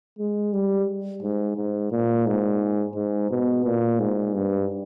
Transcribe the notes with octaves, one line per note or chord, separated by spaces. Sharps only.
G#3
G3
G#2
G#2
A#2
G#2
G#2
B2
A#2
G#2
G2